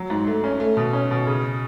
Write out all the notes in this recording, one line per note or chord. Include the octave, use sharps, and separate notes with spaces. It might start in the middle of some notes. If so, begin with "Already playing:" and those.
Already playing: F#3
G#2
A3
C#4
A3
B2
C#4
B2
C#3